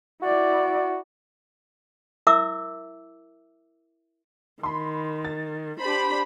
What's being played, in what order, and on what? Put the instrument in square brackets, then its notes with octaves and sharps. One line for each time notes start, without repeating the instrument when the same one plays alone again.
[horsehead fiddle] E4 D5 [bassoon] F#4
[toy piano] E4 A#4 E5 D6 E6
[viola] D#3 [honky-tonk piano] B5 C6
[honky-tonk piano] A6
[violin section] D4 B5 [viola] G4 C5